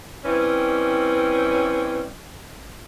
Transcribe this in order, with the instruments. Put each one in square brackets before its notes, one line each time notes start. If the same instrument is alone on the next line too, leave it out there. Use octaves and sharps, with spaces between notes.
[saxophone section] E3 G3 C4 C#4